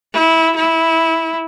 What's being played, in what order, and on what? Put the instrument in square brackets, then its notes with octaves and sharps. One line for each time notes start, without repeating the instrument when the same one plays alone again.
[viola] E4
E4